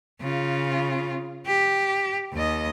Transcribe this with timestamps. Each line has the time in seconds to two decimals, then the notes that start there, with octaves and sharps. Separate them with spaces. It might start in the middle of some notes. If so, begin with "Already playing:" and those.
0.21 C#3 F4
1.47 G4
2.33 D#2 D#5